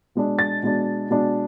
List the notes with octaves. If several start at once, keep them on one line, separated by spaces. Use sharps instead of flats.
B2 G#3 D4
A6
B2 G#3 D4
B2 G#3 D4